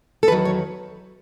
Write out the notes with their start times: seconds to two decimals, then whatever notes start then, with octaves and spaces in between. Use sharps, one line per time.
0.23 A4
0.28 E2 D#3 F#3 B4
0.45 C#5